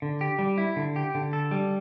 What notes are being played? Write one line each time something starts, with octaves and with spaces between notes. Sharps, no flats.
D3
G4
G3
E4
D3
G4
D3
A4
G3